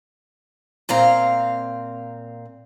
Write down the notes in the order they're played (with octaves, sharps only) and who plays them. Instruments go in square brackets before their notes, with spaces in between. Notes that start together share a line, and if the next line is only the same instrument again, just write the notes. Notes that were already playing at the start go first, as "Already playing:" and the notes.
[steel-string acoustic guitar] A#2 C4 F5 A#5